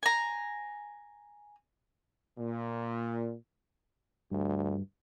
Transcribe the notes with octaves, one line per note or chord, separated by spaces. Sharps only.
G#5 A#5
A#2
D2 G2